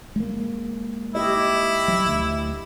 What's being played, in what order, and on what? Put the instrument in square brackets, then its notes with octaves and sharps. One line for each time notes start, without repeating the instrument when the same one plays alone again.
[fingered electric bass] G#3 A#3
[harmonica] E4 [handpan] G4 D#5
[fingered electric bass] F#3
D2